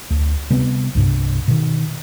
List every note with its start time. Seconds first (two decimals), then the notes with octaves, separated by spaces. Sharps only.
0.10 D2
0.50 C3 G3 B3
0.95 C2 G2 C3
1.48 B2 D#3